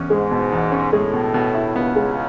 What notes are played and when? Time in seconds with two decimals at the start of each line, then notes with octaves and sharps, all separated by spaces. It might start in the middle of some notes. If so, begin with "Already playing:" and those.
Already playing: E2 C#4
0.10 G#2 G#3
0.31 B2
0.52 E2
0.72 C#4
0.93 A2 G#3
1.13 B2
1.34 B2
1.55 E4
1.75 C#2 C#3 B3
1.96 G#3